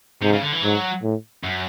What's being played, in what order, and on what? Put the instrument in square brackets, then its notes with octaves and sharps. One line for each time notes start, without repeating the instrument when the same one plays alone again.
[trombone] G#2 [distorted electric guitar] C3
[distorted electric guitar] C#3
D3
E3
[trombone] G#2 [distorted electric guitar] F#3
[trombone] A2
[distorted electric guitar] F#2